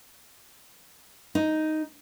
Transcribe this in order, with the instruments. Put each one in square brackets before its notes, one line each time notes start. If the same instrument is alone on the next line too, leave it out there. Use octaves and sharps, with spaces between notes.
[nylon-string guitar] D#4